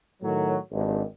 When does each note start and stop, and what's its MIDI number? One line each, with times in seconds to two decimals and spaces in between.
0.22 0.56 45
0.22 0.56 51
0.22 0.56 54
0.72 1.01 32
0.72 1.01 43